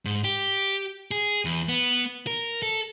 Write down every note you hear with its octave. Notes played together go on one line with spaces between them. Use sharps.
G#2
G4
G#4
E2
B3
A#4
A4